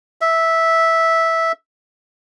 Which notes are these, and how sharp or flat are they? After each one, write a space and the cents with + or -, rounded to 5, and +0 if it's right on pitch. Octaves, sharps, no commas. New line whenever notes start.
E5 -10